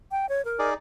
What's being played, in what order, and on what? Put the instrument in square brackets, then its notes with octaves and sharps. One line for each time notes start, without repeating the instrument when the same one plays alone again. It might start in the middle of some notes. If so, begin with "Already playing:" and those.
[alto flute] G5
C#5
A#4
[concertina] D#4 G#4 D5